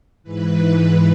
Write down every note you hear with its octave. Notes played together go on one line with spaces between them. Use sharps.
G#2 E3 B4